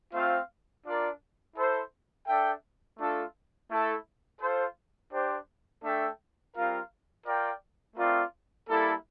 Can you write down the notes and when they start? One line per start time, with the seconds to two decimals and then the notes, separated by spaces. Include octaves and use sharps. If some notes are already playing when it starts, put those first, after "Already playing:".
0.13 A3 C4 F4 C5 F5
0.85 D4 F4 A#4 D5
1.55 E4 A4 C5
2.27 D4 A4 E5 G5
2.98 A3 D4 F4 A4
3.69 A3 E4 A4
4.40 F4 A4 C5
5.13 D4 G4 C5
5.83 A3 D4 A4 E5 G5
6.55 G3 C4 F4 A#4 F5
7.26 F4 A#4 D5 G5
7.96 A3 C4 F4 A#4 D5
8.68 G3 A#3 E4 A4